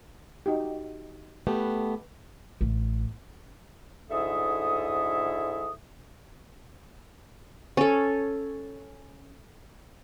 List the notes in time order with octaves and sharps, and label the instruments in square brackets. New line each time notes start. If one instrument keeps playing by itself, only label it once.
[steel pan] D#4 F#4 G4
[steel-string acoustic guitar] A3 B3 G4 [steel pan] B4
[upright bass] A1
[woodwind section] D2 G#2 E4 A4 E5 D#6
[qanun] C#4 A4